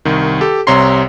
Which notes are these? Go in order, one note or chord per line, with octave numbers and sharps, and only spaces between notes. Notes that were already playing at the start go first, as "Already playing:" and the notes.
C2 D#3
G4 A4
C2 C3 C#5 A#5 C6 C7